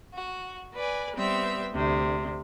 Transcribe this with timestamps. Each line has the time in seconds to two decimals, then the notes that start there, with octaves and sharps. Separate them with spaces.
0.14 F#4
0.75 B4 D5 G#5
1.16 G3 B3 C4 E5 G5
1.73 D2 C3